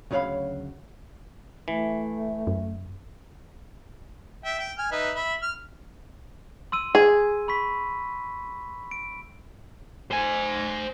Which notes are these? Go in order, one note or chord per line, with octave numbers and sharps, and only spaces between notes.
D2 C#3 F#3 C#5 F5 B5
E3 A3
F#2
E5 G5
G5
G#5 F6
D#4 B4 E5
E5 B5
F6
C6 E6 D#7
G#4
B5 C#6 B6
D7
C5 G#5